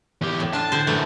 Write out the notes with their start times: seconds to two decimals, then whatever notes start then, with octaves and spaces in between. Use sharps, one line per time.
0.21 E2 G4
0.40 A2
0.53 D4 F4 A5
0.72 D3 C5
0.87 F#2 E3 A3